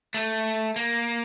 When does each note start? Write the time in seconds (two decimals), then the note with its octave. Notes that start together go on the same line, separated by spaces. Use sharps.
0.14 A3
0.76 A#3